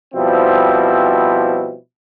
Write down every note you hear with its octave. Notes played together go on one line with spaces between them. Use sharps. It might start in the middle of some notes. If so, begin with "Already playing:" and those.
B2 F3 G3 C4 E4